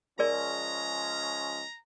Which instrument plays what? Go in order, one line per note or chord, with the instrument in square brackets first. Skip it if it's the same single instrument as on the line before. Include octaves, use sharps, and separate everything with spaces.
[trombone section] F3 G#3 C#4 [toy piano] G#4 A#4 D5 [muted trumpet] A#5